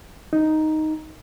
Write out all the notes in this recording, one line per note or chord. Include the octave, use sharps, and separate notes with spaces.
D#4